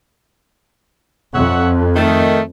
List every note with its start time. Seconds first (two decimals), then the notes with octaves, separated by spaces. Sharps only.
1.34 F2 C#5 E5 F#5
1.96 D#3 A3